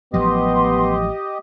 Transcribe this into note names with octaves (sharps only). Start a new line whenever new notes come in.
A1 F3 F#3 B3 G4 D#5 C6